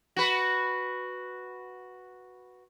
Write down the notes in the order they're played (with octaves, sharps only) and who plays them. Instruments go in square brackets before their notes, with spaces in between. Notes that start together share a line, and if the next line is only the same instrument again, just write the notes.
[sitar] F#4 B4